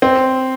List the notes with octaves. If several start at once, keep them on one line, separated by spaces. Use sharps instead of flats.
C4